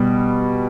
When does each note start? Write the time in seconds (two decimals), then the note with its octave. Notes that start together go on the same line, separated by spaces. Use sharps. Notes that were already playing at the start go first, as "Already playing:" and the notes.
Already playing: B2 G3